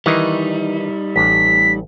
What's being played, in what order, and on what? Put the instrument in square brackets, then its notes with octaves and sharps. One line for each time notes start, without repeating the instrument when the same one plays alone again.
[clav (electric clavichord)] D#3 E3 [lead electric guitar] G3 D#4
[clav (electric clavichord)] A1 [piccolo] B6